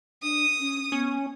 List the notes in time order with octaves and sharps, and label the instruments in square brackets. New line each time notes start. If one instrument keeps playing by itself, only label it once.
[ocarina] D4 [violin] D#6
[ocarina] C#4
[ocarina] B3 [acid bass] C#4